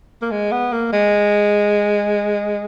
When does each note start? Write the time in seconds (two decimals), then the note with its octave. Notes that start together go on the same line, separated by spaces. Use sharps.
0.22 A#3
0.31 G#3
0.52 B3
0.73 A#3
0.93 G#3